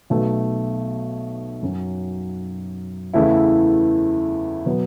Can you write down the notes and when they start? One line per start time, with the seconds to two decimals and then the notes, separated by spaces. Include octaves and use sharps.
0.10 B1 B2 A3
1.62 F#2 F#3 C#4
3.14 E2 C#3 E3 A3 E4
4.66 B2 F#3 B3 F#4